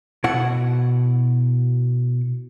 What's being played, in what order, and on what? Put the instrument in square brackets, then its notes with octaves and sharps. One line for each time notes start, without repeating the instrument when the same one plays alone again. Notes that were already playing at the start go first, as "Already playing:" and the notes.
[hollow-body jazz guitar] B2 E4 F#5